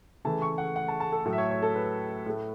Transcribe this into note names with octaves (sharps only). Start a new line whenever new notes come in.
C#3 E3 A3 A5
C#6
F#5
F#5
A5
A5
A4
A2 F#3 A3 A4
E5
C#5
C#5
A4
B4
A2 A3